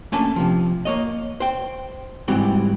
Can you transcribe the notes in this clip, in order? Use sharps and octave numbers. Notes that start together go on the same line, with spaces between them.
A3 A#3 C#4 D4 G#5 A5
C3 F3
A#3 C#5 D#5
C5 G5
G#2 E3 G3 C4 F#4 G4